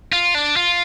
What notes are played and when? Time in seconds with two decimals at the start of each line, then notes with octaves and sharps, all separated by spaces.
0.12 F4
0.35 D4
0.56 F4